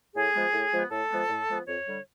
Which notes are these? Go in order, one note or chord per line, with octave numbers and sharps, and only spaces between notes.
A2 G#4
F3 G#3 B3
A2
F3 G#3 B3
A2 A4
F3 G#3 B3
A2
F3 G#3 B3
F2 C#5
D3 G3